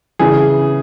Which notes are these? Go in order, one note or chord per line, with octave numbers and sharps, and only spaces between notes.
C#3 E3 G#4